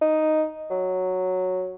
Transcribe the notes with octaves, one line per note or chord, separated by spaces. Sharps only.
D#4
F#3